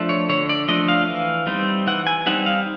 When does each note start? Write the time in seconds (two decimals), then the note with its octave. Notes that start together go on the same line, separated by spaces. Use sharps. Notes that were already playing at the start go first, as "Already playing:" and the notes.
Already playing: F3 A3 D4
0.09 C#5
0.29 D3 C#5
0.49 D5
0.68 F3 A3 D4 D#5
0.88 F5
1.08 E3
1.47 G3 C4 D#4
1.87 E3 F#5
2.07 G#5
2.26 G3 C4 D#4 F#5
2.46 F5